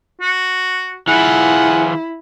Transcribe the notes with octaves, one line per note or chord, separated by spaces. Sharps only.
F#4
E3 E4 F4 G#4 F#5